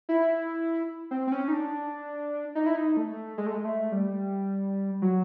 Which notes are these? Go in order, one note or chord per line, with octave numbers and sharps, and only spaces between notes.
E4
C4
C4
C#4
D#4
D4
D#4
E4
D#4
A3
G#3
A3
G#3
A3
G3
F#3